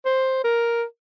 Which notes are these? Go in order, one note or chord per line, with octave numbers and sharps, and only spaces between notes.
C5
A#4